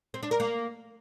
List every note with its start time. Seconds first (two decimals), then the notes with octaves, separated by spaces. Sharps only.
0.14 C4
0.23 D4
0.31 A#4
0.40 A#3